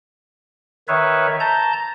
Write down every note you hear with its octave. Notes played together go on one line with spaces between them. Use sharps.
D#3 B4 C#5 E5
A5 A#5 G6